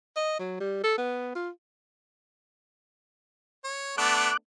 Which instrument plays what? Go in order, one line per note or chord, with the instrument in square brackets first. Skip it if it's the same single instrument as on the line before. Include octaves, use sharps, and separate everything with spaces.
[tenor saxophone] D#5
F#3
G3
A4
B3
F4
[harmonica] C#5
[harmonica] A3 B3 D4 [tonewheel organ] D6 F#6